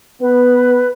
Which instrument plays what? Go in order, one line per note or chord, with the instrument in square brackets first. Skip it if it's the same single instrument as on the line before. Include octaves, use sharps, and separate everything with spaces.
[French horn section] B3 [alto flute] B4